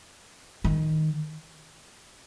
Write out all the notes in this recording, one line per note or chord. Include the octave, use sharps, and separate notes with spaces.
D#3